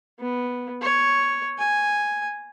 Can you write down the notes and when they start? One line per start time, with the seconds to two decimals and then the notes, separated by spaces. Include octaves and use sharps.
0.20 B3
0.82 C#5
1.58 G#5